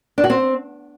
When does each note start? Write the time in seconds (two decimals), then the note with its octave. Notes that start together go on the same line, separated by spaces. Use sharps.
0.18 D4
0.24 F#4
0.30 C4